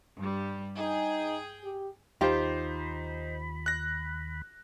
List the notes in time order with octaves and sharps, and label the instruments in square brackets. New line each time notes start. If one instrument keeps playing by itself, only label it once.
[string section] G2 G3
[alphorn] D#4 [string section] G#4 G5
[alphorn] G4
[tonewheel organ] D#2 B5 [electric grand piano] D#4 C5 [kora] F4 G4
[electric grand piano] F#6 A#6